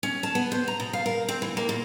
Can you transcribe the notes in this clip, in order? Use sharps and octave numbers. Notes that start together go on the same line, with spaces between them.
C#4
A5
B3
C5
A#5
B2
F5
A#4
C4
E3
A#3
A#2